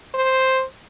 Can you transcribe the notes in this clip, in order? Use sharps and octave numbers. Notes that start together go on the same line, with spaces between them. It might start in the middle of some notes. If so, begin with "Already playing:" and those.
C5